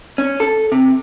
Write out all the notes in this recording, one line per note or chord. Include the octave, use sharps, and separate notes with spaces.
C#4
A4
C3